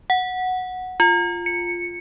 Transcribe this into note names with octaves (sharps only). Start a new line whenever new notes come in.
F#5
F4
C#7